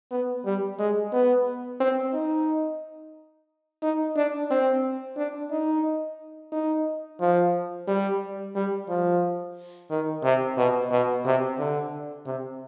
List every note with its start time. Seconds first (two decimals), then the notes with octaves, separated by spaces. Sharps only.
0.11 B3
0.45 G3
0.79 G#3
1.13 B3
1.80 C4
2.14 D#4
3.83 D#4
4.16 D4
4.51 C4
5.17 D4
5.51 D#4
6.52 D#4
7.20 F3
7.87 G3
8.55 G3
8.89 F3
9.90 D#3
10.23 C3
10.57 B2
10.91 B2
11.25 C3
11.59 D3
12.26 C3